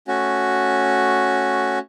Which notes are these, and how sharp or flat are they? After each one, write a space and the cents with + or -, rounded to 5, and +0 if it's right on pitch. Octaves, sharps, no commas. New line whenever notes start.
A3 +0 C#4 +0 F#4 +0